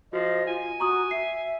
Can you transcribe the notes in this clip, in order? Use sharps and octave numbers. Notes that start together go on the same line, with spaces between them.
F3 F#4 D#5
F4 G#5
F#4 A#5 C#6 D#6
E5 C7